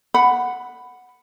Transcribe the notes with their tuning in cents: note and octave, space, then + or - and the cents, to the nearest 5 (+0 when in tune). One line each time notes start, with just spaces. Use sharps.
F#5 -5 B5 +10